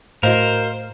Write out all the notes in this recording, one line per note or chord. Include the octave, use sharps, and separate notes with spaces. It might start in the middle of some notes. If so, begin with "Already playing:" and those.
A2 F#4 A#4 C5 D#5 F5